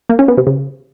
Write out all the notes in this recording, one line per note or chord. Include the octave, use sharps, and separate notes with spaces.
A#3
C#4
B3
C3
C#3